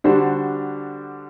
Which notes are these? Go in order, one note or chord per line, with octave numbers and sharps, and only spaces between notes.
D3 G3 D4 F#4 C5